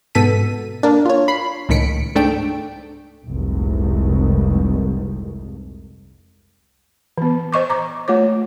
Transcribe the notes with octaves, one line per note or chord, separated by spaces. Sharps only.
G#2 B2 A4 B6 D#7
A#3 D4
F4 C#5
B5 C7
C#2 A2 D#3 B6 C#7 D7
G#2 A3 D4 G5 D7
F1 C2 G#2
E3 B3
C5 D#5 C#6 D6
A#5 D6
A3 F4 C#5 D6